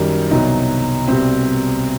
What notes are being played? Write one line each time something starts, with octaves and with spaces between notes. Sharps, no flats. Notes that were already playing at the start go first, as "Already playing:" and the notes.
Already playing: F#2 D#3 G3
C2 B2 F#3 D#4
C2 B2 G3 C4